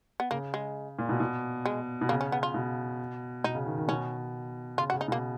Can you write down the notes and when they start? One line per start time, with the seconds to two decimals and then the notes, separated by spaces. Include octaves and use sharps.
0.20 B3
0.31 C#3 A#3
0.54 G#3
0.99 A#2
1.09 B2
1.20 B2
1.66 G#3
2.01 B2
2.09 C#3 A#3
2.21 C#4
2.32 B3
2.43 F4
2.54 B2
3.44 B2 D#4
3.55 C#3
3.66 D#3
3.78 D#3
3.88 B2 C#4
4.78 C#3 F4
4.90 F#4
4.94 C#3
5.01 D#4
5.08 B2 A#3